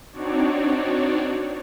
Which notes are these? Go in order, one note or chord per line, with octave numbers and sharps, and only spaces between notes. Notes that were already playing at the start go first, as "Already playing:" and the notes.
C4 D4 D#4 F#4 C#5 D5